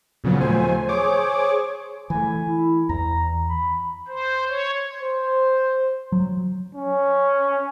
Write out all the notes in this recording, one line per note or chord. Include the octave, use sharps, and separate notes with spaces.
A#2 C#3 F3 F#3 B3
D#2 F3 A3 C5 G#5
G#4 C5 C#5 D6
E3 A3 G#5
E4
E2 A#5
B5
C5
C#5
C5
F#3
C#4